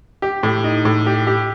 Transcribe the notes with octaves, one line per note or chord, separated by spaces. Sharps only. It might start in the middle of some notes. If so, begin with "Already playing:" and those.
G4
A2
D#4
A2
G4
G4